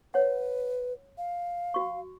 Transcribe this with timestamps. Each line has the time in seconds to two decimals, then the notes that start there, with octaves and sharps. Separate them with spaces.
0.14 B4 C#5 F#5
1.18 F5
1.74 F#4 C#6